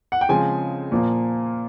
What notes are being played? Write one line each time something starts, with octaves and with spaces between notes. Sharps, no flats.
F#5
G5
C#3 F3 G#3 C4 G#5
A#2 F3 A#3